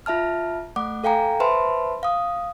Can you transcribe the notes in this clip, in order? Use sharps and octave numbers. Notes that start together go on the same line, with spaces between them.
F4 E5 A5 F6
A3 F#5 D6
A4 F5 G5 G#5 A#5
B4 C5 E5 A5 B5 C6
F5 D#6